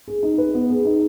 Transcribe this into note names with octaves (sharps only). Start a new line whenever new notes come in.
G#4
D#4
B4
B3
G#4
D#4